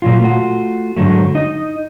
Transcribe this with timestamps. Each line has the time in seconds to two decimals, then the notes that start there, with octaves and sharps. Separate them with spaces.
0.02 A#2 F#3 F4
0.20 A3 F4 F#4
0.97 G#2 D3 F#3 A3
1.35 D#4 D#5